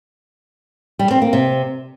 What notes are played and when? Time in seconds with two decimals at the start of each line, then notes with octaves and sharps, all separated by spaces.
0.99 G3
1.11 C4
1.22 A#3
1.33 C3